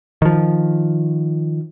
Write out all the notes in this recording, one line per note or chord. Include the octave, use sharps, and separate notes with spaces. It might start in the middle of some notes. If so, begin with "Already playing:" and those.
D#3 F3